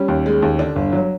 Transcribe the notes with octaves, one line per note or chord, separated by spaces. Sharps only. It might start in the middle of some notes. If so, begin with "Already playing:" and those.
Already playing: G3 C#4
D#2
G#3
D#2
D3 D4
G1
F#3